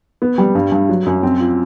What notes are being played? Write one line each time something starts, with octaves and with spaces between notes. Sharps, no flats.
B3
G3
G2
G2
F#3
F#2
C4
F4